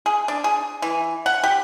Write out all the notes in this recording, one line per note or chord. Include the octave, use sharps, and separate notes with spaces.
G#4
D4
G#4
E3
F#5
G4